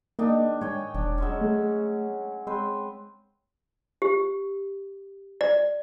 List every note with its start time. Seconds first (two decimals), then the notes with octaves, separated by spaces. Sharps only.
0.19 D#3 A#3 D4 D#4
0.61 G#2 C#5 G5 G#5
0.94 E1 D4
1.18 F#3 G#3 C#4
1.41 A3
2.47 G#3 C4 B4 C5
4.02 G4
5.41 D5